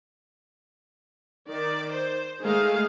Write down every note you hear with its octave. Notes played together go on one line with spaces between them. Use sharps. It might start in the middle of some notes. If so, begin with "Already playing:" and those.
D#3 D5
C5
D#3 G#3 A3 G#4 F5